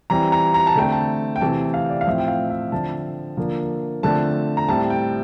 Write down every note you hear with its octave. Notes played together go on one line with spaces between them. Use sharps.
E3 G3 C4 A#5
A#5
A#5
A5
D3 A3 C4 G5
A5
G5
C3 E3 A3 C4 A5
G5
F5
D5
F5
A2 F3 C4 E5
G5
F5
E5
D3 F3 C4 A5
D3 F3 A#3
D3 F3 A3 C4 A5
A#5
A2 G3 C4 A5
G5